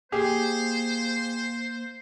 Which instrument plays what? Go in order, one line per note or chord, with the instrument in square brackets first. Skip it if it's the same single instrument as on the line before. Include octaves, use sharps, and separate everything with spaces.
[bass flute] A#3 [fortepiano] G4 G#4 [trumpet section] C5